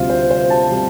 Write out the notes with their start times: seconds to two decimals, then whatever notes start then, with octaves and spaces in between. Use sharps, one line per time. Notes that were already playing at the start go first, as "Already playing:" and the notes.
Already playing: D2 C3 G3 C4 F4
0.10 C5
0.30 C5
0.50 A5
0.71 C3 G3 C4